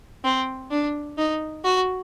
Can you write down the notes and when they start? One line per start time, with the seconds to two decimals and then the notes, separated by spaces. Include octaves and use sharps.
0.24 C4
0.71 D4
1.18 D#4
1.64 F#4